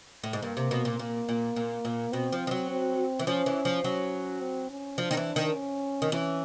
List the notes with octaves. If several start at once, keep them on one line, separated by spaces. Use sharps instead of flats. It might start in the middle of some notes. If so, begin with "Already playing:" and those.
A2
G#2
G2 A#3
C3
B2
A#2
A#2 A#3
A#2
A#2
A#2
B2 C4
F3
F3
F#3
C4
E3
F3 C#4
E3
F3
F#3 C#4
C4
C#4
F3 D4
D#3
E3
D#3
C#4
D#3
E3 C#4